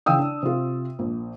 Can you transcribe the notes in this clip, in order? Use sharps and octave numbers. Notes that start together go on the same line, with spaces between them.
C#3 E3 F5 G5 D#6 E6
D4
C3 F4
A#1